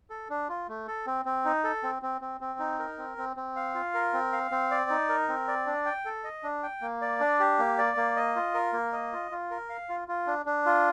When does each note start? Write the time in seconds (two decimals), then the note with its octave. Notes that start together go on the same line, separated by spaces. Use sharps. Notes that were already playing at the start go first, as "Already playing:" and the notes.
0.10 A4
0.30 D4
0.49 F4
0.69 A3
0.87 A4
1.06 C4
1.25 C4
1.45 D#4
1.64 A4
1.83 C4
2.02 C4
2.21 C4
2.41 C4
2.59 D#4
2.79 A#4
2.98 C4
3.18 C4
3.37 C4
3.56 F5
3.75 F4
3.94 A#4
4.13 C4
4.32 F5
4.51 C4
4.71 D5
4.90 D#4
5.09 A#4
5.28 C4
5.48 D5
5.66 D4
5.86 G5
6.05 A4
6.24 D#5
6.43 D4
6.63 G5
6.81 A#3
7.01 D5
7.20 D4
7.40 G4
7.59 A#3
7.78 D5
7.97 A#3
8.16 D#5
8.36 F4
8.54 A#4
8.73 A#3
8.93 D#5
9.13 F4
9.31 F4
9.51 A#4
9.69 F5
9.89 F4
10.08 F4
10.27 D4
10.46 D4
10.66 F4